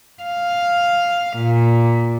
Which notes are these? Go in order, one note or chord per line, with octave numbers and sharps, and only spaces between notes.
F5
A#2